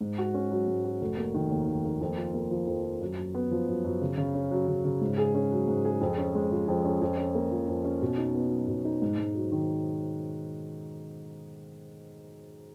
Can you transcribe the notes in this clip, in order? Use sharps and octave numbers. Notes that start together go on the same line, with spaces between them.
G#2
F#4
C#4
F#3
G#2
F#4
F1
A#3
D#3
D#2
F1
A#3
F2
F4
A#3
F3
F2
F4
F#2
F#2
B3
F3
F#2
F#2
C#3
C#3
C#4
F#3
C#3
C#3
G#2
G#4
C#4
F#3
G#2
G#4
F2
C#4
G#3
F3
F2
C#4
F2
C#4
A#3
F3
F2
C#4
B2
D#4
B3
F#3
B2
D#4
G#2
G#2
F#3
D#3